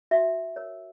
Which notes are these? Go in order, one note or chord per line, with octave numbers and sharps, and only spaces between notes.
F#4 E5
A#4 C#5